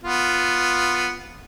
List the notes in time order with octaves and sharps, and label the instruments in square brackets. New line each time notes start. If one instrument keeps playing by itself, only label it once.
[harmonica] B3 F4